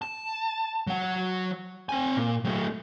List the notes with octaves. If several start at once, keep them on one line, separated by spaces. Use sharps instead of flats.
A5
F#3 F#5
C4 G#5
A#2
F#3 A3